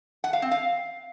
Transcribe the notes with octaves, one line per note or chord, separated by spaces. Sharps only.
F#5
F5
C4
F5